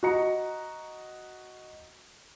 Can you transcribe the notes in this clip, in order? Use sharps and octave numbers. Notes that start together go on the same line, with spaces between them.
F#4 D#5 A#5 C#7